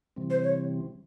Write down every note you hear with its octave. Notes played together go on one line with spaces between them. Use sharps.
C3 E3 G3 C4
C5
C#5